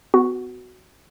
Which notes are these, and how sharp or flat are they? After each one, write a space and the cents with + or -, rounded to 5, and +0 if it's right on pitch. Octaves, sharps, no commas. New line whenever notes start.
B3 +30 F#4 +0